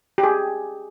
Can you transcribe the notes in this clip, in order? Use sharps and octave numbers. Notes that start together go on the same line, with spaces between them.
G4
G#4